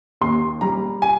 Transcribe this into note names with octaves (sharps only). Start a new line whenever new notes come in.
D#2 C6
G3 A#5
G#5